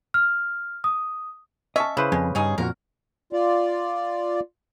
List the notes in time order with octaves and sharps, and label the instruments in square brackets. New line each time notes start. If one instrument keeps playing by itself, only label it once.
[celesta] F6
D#6
[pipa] C#4 E5 C#6 [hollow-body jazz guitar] D#5 A5
[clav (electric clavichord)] C#3 B4 C5 [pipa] E4
[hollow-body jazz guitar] F2 [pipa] G#3
[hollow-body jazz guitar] G2 [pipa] C#4 D#4 G#4
[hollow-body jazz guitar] F2 A#2 F#4 [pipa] A#4
[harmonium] F4 D5